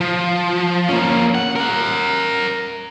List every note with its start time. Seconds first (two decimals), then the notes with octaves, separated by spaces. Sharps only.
0.01 F3
0.89 A#3 C#4
1.35 F#5
1.56 A#4 F#5